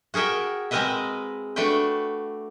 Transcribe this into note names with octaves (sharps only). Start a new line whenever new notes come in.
F#4 G#4 A#4 E5 G5
G#3 C4 A#4 B4 D#5 E5
A3 D4 F#4 B4 G5